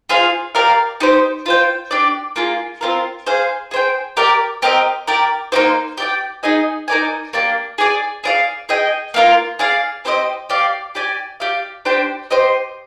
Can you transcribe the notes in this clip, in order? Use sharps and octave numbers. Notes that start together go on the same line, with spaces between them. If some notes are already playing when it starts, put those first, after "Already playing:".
F4 G#4 C5 F5
G4 A#4 D5 F5
D#4 G4 C5
F4 C5 G5
D4 G4 D5
A#3 F4 G#4
C4 F4 A#4
G#4 C5 F5
G#4 C5 G5
G4 A#4 D5 G5
C4 G4 A#4 D#5
G4 A#4 D5
A#3 D#4 G4 C5
G4 D5 G5
D#4 G#4 D#5 G#5
D#4 A#4 D5 G#5
A#3 D4 G4
G#4 D5 G#5
G#4 D5 F5
G#4 D#5 G5
A#3 F4 A#4
G#4 D5 F5
C4 G4 C5 D#5
G4 D5 F5
G4 D5 G#5
G4 D5 F5
D4 G4 C5 G5
G4 C5 D#5